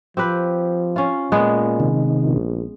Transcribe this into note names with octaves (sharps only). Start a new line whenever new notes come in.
F3 C4 G4 B4
C#4 F4
A#2 G#3 B3
C3 D#3
A#1